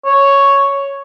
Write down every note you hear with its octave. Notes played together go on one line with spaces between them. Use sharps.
C#5